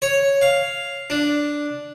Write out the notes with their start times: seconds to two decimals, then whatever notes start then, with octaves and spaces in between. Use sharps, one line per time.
0.02 C#5
0.42 F5
1.10 D4